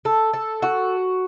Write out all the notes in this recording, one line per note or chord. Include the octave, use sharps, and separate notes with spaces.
A4
A4
F#4